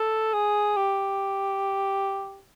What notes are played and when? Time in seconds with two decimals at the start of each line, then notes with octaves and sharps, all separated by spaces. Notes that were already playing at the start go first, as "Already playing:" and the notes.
Already playing: A4
0.33 G#4
0.76 G4